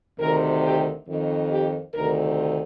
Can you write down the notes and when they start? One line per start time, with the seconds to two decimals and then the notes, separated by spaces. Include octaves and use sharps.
0.19 D2 C3 D#3 A#4
0.64 G4
1.07 F2 D#3
1.50 G4
1.94 D2 C3 D#3 A#4